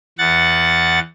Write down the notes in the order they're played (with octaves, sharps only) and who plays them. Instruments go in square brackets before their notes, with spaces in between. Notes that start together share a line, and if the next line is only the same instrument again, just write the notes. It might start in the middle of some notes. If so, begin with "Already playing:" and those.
[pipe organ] E2 F#5 A6